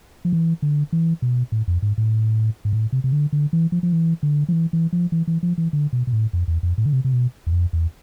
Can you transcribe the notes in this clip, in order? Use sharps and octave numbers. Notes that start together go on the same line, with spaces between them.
F3
E3
D3
E3
B2
A2
F2
G#2
A2
G#2
A2
C3
C3
D3
D3
E3
F3
F3
E3
D3
F3
E3
E3
F3
E3
E3
F3
E3
D3
B2
B2
A2
F2
E2
F2
A2
D3
C3
C3
B2
E2
F2
E2